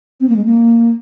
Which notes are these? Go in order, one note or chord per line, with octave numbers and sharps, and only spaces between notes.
C4
A#3
G#3
A#3